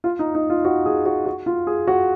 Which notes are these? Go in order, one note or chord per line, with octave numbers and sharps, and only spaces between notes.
F4
D#4
D#4
F4
F#4
G#4
F#4
F#4
F4
G#4
F#4